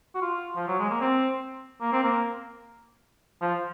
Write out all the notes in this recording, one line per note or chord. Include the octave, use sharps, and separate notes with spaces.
F#4
F4
F3
F#3
G#3
A#3
C4
A#3
C4
A#3
F3